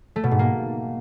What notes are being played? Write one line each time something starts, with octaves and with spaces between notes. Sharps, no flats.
A3
B2
G#2
A#3